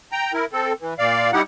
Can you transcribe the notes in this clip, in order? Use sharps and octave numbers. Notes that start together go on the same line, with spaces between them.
G5 A#5
E4 A#4
C4 A4
E3
A#2 D5 F5
G3 D#4 E4 G4 F#5